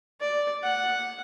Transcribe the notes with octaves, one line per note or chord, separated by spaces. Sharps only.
D5
F#5